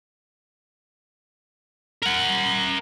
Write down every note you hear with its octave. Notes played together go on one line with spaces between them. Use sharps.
A#4 F#5